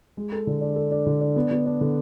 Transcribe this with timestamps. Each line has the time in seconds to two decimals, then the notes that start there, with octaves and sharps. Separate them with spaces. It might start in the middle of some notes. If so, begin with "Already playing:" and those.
0.17 G#3
0.32 A4
0.47 D3
0.61 D4
0.76 A4
0.91 D4
1.06 D3
1.21 D4
1.36 B3
1.51 B3
1.66 D4
1.81 D3